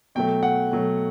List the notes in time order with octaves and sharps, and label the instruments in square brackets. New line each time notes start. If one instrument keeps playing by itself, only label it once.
[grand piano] B2 F#3 A3 G5
F#5
B2 F#3 A3